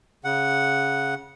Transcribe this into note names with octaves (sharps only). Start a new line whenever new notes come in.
C#3 F#5